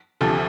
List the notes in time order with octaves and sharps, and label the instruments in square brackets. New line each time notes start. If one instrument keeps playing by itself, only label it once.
[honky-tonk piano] D2 C3 F3 A4